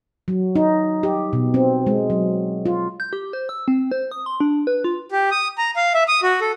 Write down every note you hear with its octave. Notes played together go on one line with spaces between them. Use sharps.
F#3
D#4
G4
B2
C4
G#3
F#3
F4
G6
G4
C5
E6
C4
C5
D#6
C6
D4
B4
F4
G4
D#6
A#5
F5
E5
D#6
F#4
A4